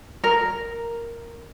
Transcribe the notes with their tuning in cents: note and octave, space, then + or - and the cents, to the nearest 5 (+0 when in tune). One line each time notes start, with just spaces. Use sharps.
A#4 +0